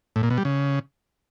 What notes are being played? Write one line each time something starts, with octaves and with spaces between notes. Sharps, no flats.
A2
A#2
B2
G3
C#3